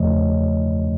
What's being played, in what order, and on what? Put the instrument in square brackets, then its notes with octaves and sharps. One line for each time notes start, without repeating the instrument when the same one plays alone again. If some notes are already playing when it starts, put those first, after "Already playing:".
Already playing: [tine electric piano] E2 C#3 F3 A3 C#5 D#5